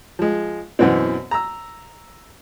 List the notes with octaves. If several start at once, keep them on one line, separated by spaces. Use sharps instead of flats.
F3 G#3
F#2 B2 E3 B3 C4
A#5 E6